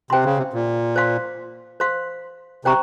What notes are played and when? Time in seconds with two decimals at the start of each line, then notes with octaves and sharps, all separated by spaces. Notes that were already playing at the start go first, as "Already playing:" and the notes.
0.10 C3 C5 G5 C6
0.25 C#3
0.37 C3
0.53 A#2
0.96 C5 F5 C6
1.80 C5 F5 C6
2.65 C3 C5 G5 A#5 C#6